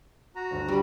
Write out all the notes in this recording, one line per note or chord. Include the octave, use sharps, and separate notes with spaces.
F#4 A#5
G1 D2 F#6
G3